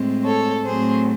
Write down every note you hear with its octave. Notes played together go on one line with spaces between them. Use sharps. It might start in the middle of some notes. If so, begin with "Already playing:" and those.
Already playing: A2 G#3 C4
A4 C#5
A2 F#3 A3 C4 G#4 C5